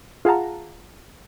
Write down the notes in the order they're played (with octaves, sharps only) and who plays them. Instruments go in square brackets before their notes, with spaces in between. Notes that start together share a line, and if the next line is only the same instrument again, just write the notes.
[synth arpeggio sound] F4 G#4 F5 F#5 A5 A#5